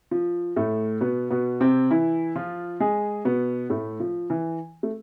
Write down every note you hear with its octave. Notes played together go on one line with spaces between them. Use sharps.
F3
A2 A3
B2 B3
B2 B3
C3 C4
E3 E4
F3 F4
G#3 G#4
B2 B3
A2 A3
F3
E3
A3